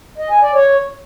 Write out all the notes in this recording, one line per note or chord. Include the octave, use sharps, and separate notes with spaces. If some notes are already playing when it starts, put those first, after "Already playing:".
D#5
G#5
D5
C#5